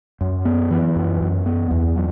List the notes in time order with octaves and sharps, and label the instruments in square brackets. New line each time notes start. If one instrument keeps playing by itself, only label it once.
[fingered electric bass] F#2
B3
E3
F#2
F#2
B3
E2
F#3